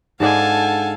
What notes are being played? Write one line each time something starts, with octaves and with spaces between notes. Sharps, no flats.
G#2 G#3 D4 A4 F5 F#5 G#5 A5